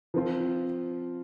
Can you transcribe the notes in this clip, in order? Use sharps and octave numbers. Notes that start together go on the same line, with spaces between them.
F3 C4 F4